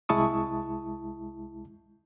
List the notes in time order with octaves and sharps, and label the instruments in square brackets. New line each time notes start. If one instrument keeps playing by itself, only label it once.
[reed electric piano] C2 G#3 E4 A5 C#6 D#6